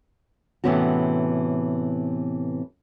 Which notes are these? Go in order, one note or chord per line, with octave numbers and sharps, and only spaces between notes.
A2 C3 E3 B3 C#4 F#4